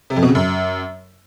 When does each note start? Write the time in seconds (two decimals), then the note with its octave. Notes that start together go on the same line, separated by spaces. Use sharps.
0.10 C3
0.16 F2
0.23 B2
0.29 C#3
0.35 F#2